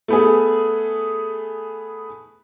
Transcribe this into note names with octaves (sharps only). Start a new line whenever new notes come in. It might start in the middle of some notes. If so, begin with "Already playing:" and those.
A3 B3 G#4